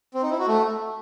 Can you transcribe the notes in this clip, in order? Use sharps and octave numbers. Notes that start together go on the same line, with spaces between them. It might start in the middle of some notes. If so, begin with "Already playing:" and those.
C4
D#4
E4
F#4
A3